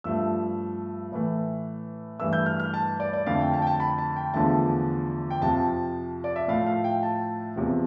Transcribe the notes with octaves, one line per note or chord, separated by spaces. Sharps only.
G2 F3 A3 E6
A2 E3 A3
G2 E3 A3 E6
G6
F6
F6
A5
D5
D5
F2 D3 A3 F5
G5
A5
G5
A5
B5
A5
G5
E2 D3 F3 A3 A5
G5
F2 C3 F3 A5
D5
E5
A2 F3 A3 F5
F5
G5
A5
E2 C3 F3